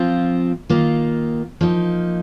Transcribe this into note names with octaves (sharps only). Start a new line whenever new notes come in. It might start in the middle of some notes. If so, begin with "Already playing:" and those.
Already playing: F3 C4 F4
D#3 A#3 F4
F3 A#3 D#4